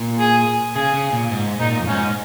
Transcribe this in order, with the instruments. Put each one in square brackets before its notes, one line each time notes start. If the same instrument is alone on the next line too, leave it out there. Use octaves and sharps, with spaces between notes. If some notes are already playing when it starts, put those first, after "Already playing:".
Already playing: [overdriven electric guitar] A#2
[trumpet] G#4
[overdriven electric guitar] C#3 [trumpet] G#4
[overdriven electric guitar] C#3
A#2
G#2
[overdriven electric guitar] A#2 [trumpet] D#4
[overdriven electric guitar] F2
[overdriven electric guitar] G#2 [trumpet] C#4